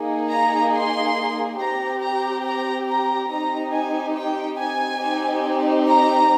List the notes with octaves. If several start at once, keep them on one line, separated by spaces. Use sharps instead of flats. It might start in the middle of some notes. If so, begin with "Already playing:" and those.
Already playing: A#3 D#4 G#4
A#5
C6
C4 G4 A#5
A#5
A#5
A#5
C4 D#4 G4 A#5
G#5
G5
G#5
C4 D#4 G4
A#5